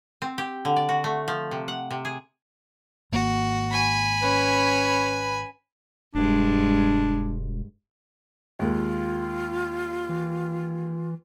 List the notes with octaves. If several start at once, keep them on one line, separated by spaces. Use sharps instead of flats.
C4
G4
D3
D5
F#4
A3
F3
C3
F#5
C3
G#4
G#1 A#3 F#4
G#5 B5
C#4 B4
E1 G2 G#3 D4
D#2 G#3 A#3 F4
E3